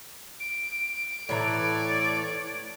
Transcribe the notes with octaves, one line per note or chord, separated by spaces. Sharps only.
D7
A2 E3 A4 C#5 D5 A#5